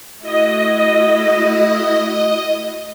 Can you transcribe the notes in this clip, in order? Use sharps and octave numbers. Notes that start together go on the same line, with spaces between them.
A3 E4 F#4 D#5